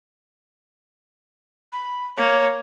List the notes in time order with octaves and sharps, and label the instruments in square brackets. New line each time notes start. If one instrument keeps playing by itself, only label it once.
[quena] B5
[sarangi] A#3 [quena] C#5